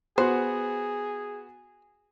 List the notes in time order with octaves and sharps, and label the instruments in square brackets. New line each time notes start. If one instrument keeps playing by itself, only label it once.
[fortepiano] B3 F#4 [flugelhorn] G#4 [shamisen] C5